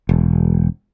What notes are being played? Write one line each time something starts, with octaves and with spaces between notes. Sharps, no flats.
E1